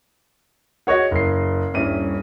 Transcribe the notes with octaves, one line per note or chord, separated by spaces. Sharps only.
F#4 G#4 C#5 D#5 F#5
F#1 C7
D#1 G2 C#4 E4 D#7